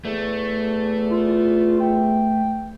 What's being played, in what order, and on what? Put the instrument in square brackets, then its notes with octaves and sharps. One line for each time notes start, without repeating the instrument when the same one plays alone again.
[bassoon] E2 [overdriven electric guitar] A3
[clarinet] F4
G5